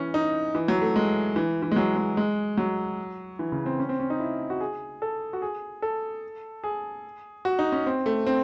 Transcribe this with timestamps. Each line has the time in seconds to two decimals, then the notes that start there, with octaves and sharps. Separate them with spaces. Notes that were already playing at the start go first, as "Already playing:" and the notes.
Already playing: E3 C#4
0.14 D#4
0.55 E3
0.68 F#3
0.82 A3
0.96 G#3
1.36 E3
1.62 E3
1.72 G#3
1.76 F#3
1.97 G#3
2.17 G#3
2.58 F#3
3.39 E3
3.52 C#3
3.66 C4
3.80 C#4
3.89 C4
4.00 C#4
4.10 D#4
4.20 E4
4.50 F#4
4.61 G#4
5.02 A4
5.33 F#4
5.42 G#4
5.82 A4
6.64 G#4
7.45 F#4
7.59 D#4
7.72 C#4
7.86 C4
8.06 A3
8.27 C4